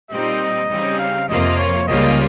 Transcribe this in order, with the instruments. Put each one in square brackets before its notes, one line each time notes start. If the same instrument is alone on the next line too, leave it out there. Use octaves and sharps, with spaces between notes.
[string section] A#2 G3 C4 D#4 [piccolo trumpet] D#5
[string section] C#3 G3 C4 D#4
[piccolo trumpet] F5
[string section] F2 C3 F3 A#3 F4 [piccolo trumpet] D#5
[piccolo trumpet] C#5
[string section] C#2 C#3 G3 A#3 F4 [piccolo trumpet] D#5